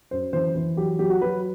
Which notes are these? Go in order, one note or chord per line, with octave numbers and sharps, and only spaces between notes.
F#2 C5
E3 C5
E3
F#3 G4
F#3 G4
F#4
F#3 B4